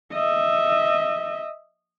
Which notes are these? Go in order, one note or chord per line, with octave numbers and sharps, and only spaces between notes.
D#5 E5